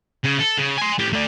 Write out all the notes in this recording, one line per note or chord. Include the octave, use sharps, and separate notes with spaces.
C#3
A4
C#3
G#5 C6
A2 G4
A3 D5